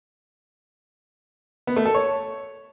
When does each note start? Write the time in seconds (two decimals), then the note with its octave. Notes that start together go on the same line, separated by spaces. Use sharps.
1.67 B3
1.76 A3
1.85 A4
1.95 C#5